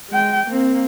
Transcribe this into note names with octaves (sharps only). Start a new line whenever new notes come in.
G#3 G5
A#3 C4